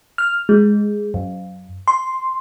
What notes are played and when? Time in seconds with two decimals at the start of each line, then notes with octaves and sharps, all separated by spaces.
0.18 F6
0.49 G#3
1.14 F#2
1.88 C6